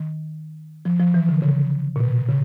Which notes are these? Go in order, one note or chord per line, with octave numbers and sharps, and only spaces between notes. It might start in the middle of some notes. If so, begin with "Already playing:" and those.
Already playing: D#3
F3
F3
E3
D3
C#3
A#2
B2
C#3